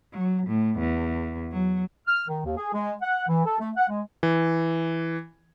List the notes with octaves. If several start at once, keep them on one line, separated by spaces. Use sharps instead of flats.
F#3
A2
E2
F#3
F6
D#3
D#2
G#4
G#3
F#5
E3
A4
A3
F#5
G#3
E3